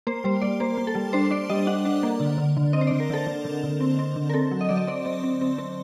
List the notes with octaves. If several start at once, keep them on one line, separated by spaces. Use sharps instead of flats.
A#3 C5
G3 C5
G3 D5
A#3 C5
A#3
A4
G3
D4 C5
D4 D5
G3 D#5
D4 F#5
D4
A#3
D3
D3
D3
C4 D#5
C5
D3 D5
A#4
D3 A4
D3
D3
D3
C4
C4
D3
A#4
C4 A4
F#3
D#5
F#3 D5
D#5
C4 D5
C4
C4
C4
C4